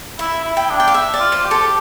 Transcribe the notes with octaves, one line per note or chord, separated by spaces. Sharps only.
E4 E5
E4
G5
D4
G5
F5
E5
D5
F4
C5
G4
A4